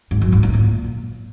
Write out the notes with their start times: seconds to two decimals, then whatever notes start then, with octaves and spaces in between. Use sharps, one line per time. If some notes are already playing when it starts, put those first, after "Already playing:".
0.11 G#2
0.22 F#2
0.32 G#2
0.43 A2
0.54 A#2